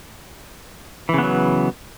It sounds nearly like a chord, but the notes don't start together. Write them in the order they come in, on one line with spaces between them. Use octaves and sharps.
E3 C#3 B3 F#3